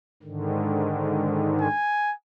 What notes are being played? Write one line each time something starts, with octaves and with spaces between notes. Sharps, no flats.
G#2 D3 D#3
G#5